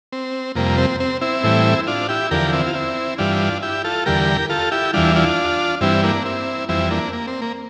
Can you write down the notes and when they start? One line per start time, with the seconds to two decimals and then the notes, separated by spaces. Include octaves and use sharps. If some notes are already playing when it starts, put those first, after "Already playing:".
0.12 C4
0.55 F2 C3 G3 A#3
0.78 C4
1.00 C4
1.21 C4 E4
1.44 A2 E3 G3
1.87 D4 F4
2.09 E4 G4
2.31 E2 D3 F3 G4 A#4
2.53 C4 E4
2.67 F4
2.74 C4 E4
3.18 G2 E3 G3 D4 F4
3.62 E4 G4
3.84 F4 A4
4.06 E2 D3 G3 G4 A#4
4.50 F4 A4
4.72 E4 G4
4.94 E2 E3 G3 D4 F4
5.16 D4 F4
5.81 G2 E3 G3 C4 E4
6.03 A#3 D4
6.25 C4 E4
6.69 F2 E3 G3 C4 E4
6.91 A#3 D4
7.13 A#3
7.27 C4
7.42 A#3